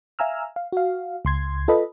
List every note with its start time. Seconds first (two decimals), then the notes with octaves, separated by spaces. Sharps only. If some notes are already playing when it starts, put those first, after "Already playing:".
0.19 E5 F5 G#5 A#5 E6 F6
0.56 F5
0.72 F#4 F5
1.25 C#2 C6 G#6
1.68 F4 A4 B4 D#5 B5